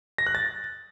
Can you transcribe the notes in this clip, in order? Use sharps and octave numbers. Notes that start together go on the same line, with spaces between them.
A#6
F#6
A6